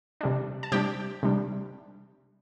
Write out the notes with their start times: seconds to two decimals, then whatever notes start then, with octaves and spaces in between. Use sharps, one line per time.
0.21 C3 G3 D4
0.63 A5
0.72 C3 G3 D4 G4 G5
1.23 C3 G3 D4